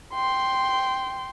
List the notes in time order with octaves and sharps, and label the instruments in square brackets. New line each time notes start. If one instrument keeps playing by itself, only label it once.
[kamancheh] G5 C6